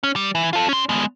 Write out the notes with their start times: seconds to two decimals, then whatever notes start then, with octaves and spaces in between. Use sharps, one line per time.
0.03 C#4
0.16 G3
0.35 E3
0.53 F4 A4
0.69 C#4 C6
0.89 G#3 B3